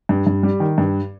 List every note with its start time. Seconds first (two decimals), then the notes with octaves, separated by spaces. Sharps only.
0.09 G2
0.27 G2
0.43 G3
0.60 D#3
0.78 G2